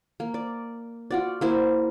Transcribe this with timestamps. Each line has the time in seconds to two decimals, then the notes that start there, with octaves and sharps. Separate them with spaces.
0.20 A#3
0.34 D5
1.11 F4 F#4 D5
1.41 A#3 E4 C5